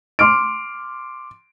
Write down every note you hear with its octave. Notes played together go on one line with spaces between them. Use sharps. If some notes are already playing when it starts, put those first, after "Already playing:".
C6 D6 F6 D7